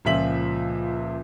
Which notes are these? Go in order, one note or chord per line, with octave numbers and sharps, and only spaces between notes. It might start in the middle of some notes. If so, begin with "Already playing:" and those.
C#2 A#2 F3 E5 B6 F#7